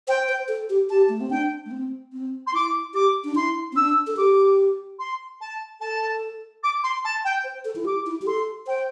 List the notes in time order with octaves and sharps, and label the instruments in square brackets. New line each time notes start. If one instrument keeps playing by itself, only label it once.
[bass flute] C5 [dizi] G5
[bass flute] C5
A4
G4
[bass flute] G4 [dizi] A5
[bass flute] A3
C4
[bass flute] D4 [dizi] G5
[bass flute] A3
C4
C4
[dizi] C6
[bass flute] E4 [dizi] D6
[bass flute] G4 [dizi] D6
[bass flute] D4
[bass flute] E4 [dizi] C6
[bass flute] C4
[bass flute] D4 [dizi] E6
[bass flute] A4
[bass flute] G4 [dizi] D6
[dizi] C6
A5
[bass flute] A4 [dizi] A5
[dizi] D6
C6
A5
G5
[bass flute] C5
A4
E4
[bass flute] G4 [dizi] D6
[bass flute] E4
G4
[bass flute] A4 [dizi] C6
[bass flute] C5 [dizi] G5